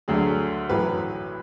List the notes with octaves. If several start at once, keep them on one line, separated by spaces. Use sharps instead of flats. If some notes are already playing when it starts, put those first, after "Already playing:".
D2 D3 F#3 G#4
A1 A2 F#3 B4